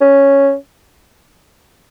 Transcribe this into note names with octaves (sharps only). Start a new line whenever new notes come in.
C#4